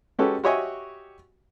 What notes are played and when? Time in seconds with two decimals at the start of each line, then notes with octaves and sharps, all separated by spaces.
0.19 G#3 C#4 F#4 G4 A4 B4
0.44 F#4 G4 C#5 D#5 E5 G#5